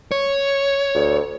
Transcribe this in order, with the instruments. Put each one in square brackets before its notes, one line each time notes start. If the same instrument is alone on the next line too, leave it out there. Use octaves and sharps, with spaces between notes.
[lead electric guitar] C#5
[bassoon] D2